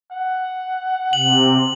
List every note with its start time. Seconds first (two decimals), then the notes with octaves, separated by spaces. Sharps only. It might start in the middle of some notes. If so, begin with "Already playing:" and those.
0.12 F#5
1.13 C3 F#7